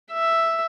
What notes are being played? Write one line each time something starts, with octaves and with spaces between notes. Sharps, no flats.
E5